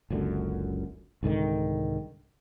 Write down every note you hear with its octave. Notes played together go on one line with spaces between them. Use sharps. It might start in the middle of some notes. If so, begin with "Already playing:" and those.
F#1 C#2 F#2 D3
C2 G#2 D3 D#3